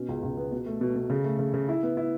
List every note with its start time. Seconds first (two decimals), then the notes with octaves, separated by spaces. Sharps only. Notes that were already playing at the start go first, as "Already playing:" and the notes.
Already playing: B2 C#4
0.09 C#2
0.23 C#2
0.37 B3
0.52 B2
0.66 A3
0.81 B2
0.96 B2
1.10 C#3
1.24 A3
1.39 C#3
1.54 C#3
1.69 E4
1.83 B3
1.97 E4